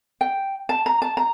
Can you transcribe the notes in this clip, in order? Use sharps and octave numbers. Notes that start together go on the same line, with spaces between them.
G5
A5
A#5
A5
A#5